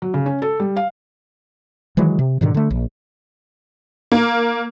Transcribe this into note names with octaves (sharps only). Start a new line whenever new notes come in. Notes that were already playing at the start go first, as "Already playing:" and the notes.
F#3
C#3
C#4
A4
G3
F5
D#3 E3 F#3 G#3
C3
G#2 B2 D3 D#3
D3 A3
A#1
A#3